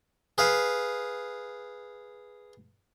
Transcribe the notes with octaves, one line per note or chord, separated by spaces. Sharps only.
G#4 B4 F5